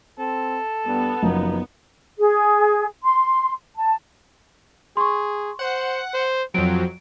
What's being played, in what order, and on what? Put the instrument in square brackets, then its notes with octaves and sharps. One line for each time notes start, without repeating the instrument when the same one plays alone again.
[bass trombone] C4 [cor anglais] A4
[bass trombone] G2 [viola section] B3
[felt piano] F#1 F3 [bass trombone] D#4
[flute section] G#4
C6
A5
[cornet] G#4 [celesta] C6 C#6
[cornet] C5 [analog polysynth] F#5
[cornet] C5
[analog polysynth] F2 F#3 [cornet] C4 [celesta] D7